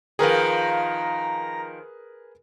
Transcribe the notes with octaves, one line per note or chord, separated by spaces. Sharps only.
D#3 F3 G#4 A#4 B4 A#5